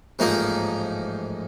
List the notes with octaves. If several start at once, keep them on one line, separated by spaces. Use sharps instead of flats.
A1 G#2 F3 A#3 D#4